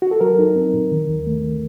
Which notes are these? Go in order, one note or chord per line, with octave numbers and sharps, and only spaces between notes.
F#4
A4
F#3 A#4
D#4
C4
A#2
D#3
D#2
A3